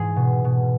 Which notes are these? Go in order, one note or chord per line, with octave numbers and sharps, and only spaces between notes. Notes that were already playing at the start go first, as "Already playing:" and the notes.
Already playing: G#2 E3 G#4
B2
B2